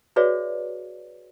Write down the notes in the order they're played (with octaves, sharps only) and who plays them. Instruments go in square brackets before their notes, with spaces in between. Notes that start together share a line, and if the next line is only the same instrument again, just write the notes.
[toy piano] F#4 G#4 B4 C#5 D5 E5